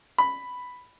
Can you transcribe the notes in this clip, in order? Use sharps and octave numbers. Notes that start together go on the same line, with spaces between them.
B5